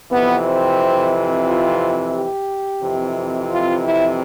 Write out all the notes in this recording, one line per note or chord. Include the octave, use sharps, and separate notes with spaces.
F2 C3 E3 B3
C4
F4
G4
F2 C3 E3
F4
E4